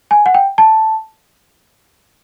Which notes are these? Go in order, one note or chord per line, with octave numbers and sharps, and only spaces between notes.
G#5
F#5
G5
A5